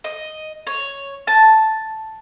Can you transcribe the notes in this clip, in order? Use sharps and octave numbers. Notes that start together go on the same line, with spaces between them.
D#5
C#5
A5